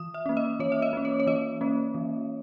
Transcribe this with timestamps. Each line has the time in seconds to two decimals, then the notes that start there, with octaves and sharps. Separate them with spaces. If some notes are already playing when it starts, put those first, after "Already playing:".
Already playing: E3 D#6
0.14 E5
0.26 A#3 C#4
0.37 D#5
0.59 E3 C#5
0.72 E5
0.82 D#5
0.93 A#3 C#4
1.05 C#5
1.20 C#5
1.27 E3 D#5
1.61 A#3 C#4
1.95 E3